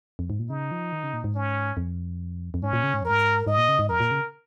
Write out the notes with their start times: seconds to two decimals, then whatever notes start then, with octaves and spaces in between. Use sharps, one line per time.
0.19 F2
0.30 G#2
0.39 A#2
0.50 C#3 D#4
0.71 F3
0.92 D#3
1.03 C#3
1.13 A#2
1.24 G#2
1.35 C#4
1.77 F2
2.54 F2
2.62 G#2 C#4
2.73 A#2
2.84 C#3
2.94 G#2
3.02 F2
3.05 G#2 A#4
3.47 G#2 D#5
3.58 A#2
3.69 C#3
3.79 G#2
3.89 F2 A#4
4.00 A#2
4.11 C#3